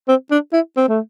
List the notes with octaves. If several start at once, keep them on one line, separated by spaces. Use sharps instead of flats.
C4
D4
E4
C4
A3